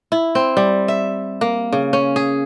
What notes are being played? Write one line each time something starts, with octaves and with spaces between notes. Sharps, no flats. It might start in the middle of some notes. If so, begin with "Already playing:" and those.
E4
C4
G3
E5
A#3
C#3
C#4
G#4